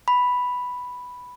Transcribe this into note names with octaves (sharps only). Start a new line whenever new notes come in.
B5